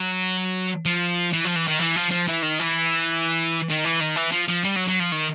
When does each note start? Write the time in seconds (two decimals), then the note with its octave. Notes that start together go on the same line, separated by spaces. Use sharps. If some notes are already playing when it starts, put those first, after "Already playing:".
Already playing: F#3
0.85 F3
1.33 E3
1.44 F3
1.55 E3
1.67 D#3
1.79 E3
1.96 F3
2.11 F3
2.28 E3
2.42 D#3
2.59 E3
3.70 D#3
3.85 E3
4.01 D#3
4.16 E3
4.32 F3
4.48 F3
4.64 G3
4.76 F#3
4.87 F#3
4.99 F3
5.12 D#3